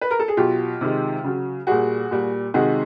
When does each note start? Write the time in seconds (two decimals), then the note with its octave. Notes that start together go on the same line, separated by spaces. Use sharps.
0.01 B4
0.11 A#4
0.19 A4
0.28 G#4
0.37 B2 F#3 F4 G4
0.81 C3 D#3 G#3
1.24 C#3 F#3
1.67 A#2 G3 F#4 G#4
2.11 A#2 G3
2.54 C3 D#3 G#3 F#4 G#4